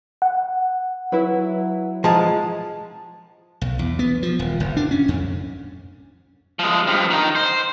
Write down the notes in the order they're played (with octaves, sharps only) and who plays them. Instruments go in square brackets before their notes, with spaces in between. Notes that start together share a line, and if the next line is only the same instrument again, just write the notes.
[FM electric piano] F#5
[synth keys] F#3 E4 [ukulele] B4
[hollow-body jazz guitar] F3 G#3 [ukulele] A5 A#5
[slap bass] B1
E2
B3
F3
D#1
F#1
D4
C#4
F2
[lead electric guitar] F3 G#3
G2 F3
D#3 D#4
C5